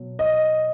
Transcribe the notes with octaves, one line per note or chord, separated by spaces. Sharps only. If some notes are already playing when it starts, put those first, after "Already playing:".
Already playing: B2 F#3
D#5